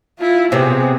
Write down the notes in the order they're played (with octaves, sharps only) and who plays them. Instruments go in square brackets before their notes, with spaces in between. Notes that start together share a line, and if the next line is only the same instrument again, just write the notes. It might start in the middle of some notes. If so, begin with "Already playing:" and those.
[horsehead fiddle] E4 F4
[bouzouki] C3 C4 [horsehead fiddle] B3 G#4